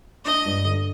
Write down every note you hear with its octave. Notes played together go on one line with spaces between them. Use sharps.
D4 D#5
G2
D3